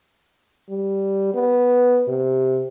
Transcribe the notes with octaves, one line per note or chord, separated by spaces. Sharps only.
G3
B3
C3